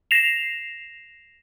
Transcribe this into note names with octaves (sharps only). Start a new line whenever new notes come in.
A#6 C7 E7 F7